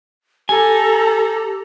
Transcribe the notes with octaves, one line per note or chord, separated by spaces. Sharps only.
G4 A4 G#5 A#5